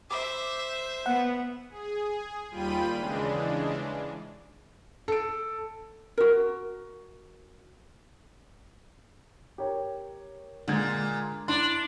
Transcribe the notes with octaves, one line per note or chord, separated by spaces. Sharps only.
C5 E5 D6
B3 F#5
G#4
D#2 G3 F4 G5 B5 D#7
C#3 E3 G#3 D4
A4 D7
F#4 A#4
G4 A#4 C#5
A#2 D3 G#3 G#6
D4 E4 C6